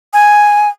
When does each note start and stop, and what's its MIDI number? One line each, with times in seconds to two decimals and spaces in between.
0.13 0.69 80